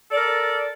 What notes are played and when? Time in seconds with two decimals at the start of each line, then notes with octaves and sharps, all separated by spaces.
0.09 A4
0.12 D5
0.15 A#4